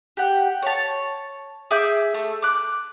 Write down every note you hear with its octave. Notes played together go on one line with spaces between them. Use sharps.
G4 F#5
C#5 A5
G#4 E5 D6 G6
A3
D6 F#6